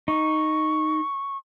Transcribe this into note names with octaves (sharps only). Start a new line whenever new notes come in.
D#4 C#6